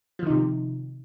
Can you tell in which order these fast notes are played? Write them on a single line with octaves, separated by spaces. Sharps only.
F3 D#3 D#4 C3